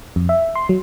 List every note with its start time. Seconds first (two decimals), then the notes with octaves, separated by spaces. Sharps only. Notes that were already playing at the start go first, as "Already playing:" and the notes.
0.16 F2
0.29 E5
0.55 C6
0.69 F#3